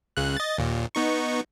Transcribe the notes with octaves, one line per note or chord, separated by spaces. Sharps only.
C#2 C#3 F#6
D#5 A6
D#2 A#2
B3 D#4 C#6